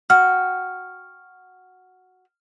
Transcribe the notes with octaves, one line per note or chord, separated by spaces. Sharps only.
F#4 G5 F6